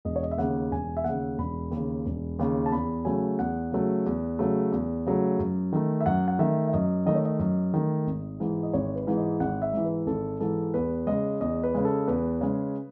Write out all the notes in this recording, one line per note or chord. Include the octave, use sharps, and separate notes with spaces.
E1 D#5
C#5
D#5
E5
D#2 C#3 F#5
E1 G#5
E5
D#2 C#3 F#5
E1 B5
D#2
C#3
E1
D#2 C#3
A5
E2 B5
C#3 F#3 A3 G#5
E2 F#5
C#3 F#3 A3
E2
C#3 F#3 A3
E2
C#3 F#3 A3
F#2
D#3 A3
E5
F#2 F#5
F#5
D#3 A3 E5
E5
F#2 D#5
D#3 A3 D#5
C#5
D#5
F#2
D#3 A3
G#1
G#2 E3
D#5
G#1 C#5
B4
G#2 E3
D#5
G#1 F#5
E5
G#2 E3
B4
G#1 A4
G#2 E3 A4
E2 B4
C#3 G#3 D#5
E2 D#5
B4
C#3 G#3
A4
E2 B4
C#3 G#3